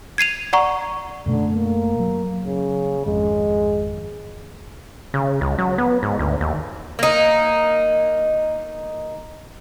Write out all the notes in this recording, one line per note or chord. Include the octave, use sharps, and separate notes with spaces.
G#6 C7 D#7 F7
D5 F#5 A#5 C#6
F#2 B2 D3 A3
A#3
F#3
C#3
G#1 F2 G#3
C#3
C#2
F#3
B3
G#2
D2
D#2
A#3 D#4